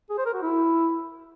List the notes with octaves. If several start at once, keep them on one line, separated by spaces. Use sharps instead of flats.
G#4
C5
A#4
F#4
E4